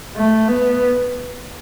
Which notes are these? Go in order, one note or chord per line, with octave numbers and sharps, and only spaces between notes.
A3
B3